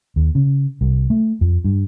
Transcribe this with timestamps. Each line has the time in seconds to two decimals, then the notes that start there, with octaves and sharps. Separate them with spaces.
0.16 D#2
0.35 C#3
0.81 C2
1.10 A3
1.41 F2
1.64 G2